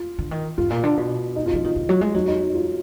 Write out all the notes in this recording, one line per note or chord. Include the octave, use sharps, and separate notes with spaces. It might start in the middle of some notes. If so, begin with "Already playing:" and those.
Already playing: F4
D3
D#3
G#2 F4
A#2
D3
B2
D#4
F4
F3 D#4
D#3 F4
D3
F#3
G#3
F#3 D#4
D#4
D#4
F4